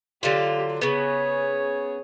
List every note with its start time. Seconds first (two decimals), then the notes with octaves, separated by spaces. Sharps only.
0.23 D3 F#3 F4 G4
0.81 C#3 B3 G#4 C#5